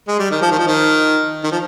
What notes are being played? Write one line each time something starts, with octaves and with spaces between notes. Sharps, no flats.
G#3
G3
D#3
F3
D#3
F3
D#3
D#3
F3